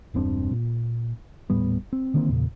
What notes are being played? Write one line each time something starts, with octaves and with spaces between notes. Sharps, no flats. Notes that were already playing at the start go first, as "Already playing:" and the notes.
E1 G2 C4 D4
A#2
D#1 A2 G3 B3
C4
D3 D#3 A#3 C4
E2 A#2 C#3